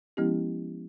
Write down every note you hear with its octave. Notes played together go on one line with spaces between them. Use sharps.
F3 G#3 B3 C#4 E4 G4